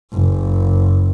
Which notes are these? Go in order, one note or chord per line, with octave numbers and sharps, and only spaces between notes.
F#1